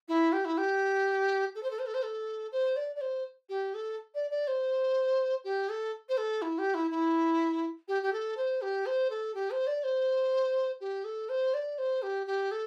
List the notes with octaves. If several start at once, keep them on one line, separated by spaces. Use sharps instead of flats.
E4
G4
E4
G4
A4
C5
A4
C5
A4
C5
A4
C5
D5
D5
C5
G4
A4
D5
D5
C5
G4
A4
C5
A4
E4
G4
E4
E4
G4
G4
A4
C5
G4
C5
A4
G4
C5
D5
C5
G4
A4
C5
D5
C5
G4
G4
A4